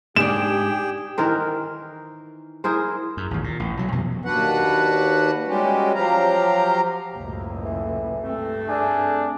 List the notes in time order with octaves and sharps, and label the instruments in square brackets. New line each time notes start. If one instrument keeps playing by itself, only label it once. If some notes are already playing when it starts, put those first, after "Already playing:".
[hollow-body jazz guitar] G#2 D4 [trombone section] G4 [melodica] G#4 G5 [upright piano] E7
[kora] D#3 E3 A#4 C5
E4 G#4 A#4 C5
[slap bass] F#2
A1 D#2
A#2
A1
B1 F#3
F2 B2 F3 F#3
[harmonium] D#2 D4 F#4 B4 F#5
G3 G#3 C#4 F#4 G4
F3 F#3 G4 F5 A#5
[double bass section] F#1 C#2 A2
[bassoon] E3
[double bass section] G2 [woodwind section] A3 C4
[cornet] D4 [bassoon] G#4